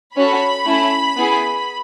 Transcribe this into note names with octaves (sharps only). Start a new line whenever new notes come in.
C#4 F#4 A4 B5
A3 C#4 E4
B3 E4 G#4